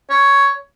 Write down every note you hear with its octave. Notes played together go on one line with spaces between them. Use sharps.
C#5